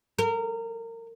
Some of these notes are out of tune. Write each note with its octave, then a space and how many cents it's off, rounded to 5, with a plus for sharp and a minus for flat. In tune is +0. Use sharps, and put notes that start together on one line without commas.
A#4 -25